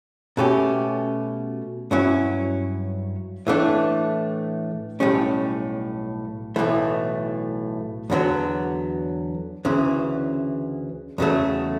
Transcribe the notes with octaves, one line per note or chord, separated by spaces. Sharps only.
B2 A3 C#4 G4
G2 F#3 C#4 E4
A2 E3 A3 D4
B1 A2 G3 C#4
B1 A2 E3 A3
E2 D3 F#3 B3
D2 C#3 E3
E2 C#3 F#3 A3